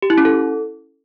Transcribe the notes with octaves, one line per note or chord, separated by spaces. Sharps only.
G4
E4
C#4
A4